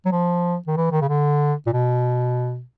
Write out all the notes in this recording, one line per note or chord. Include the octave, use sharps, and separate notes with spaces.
F#3
F3
D#3
E3
D#3
C#3
D3
A#2
B2